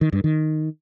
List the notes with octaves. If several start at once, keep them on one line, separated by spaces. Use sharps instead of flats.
D#3
G2
D#3